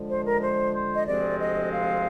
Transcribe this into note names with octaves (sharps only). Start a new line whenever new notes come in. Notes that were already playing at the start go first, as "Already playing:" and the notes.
Already playing: D3 F3 G#3
C5
A#4
C5
C5
D#5
D2 C3 F3 G#3 C4 D5
D#5
F5